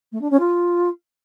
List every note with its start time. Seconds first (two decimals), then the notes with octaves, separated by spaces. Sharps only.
0.12 A3
0.21 D4
0.30 C#4
0.39 F4